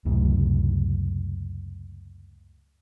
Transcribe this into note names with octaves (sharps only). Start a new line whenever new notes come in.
C#2 F#2 A2 C3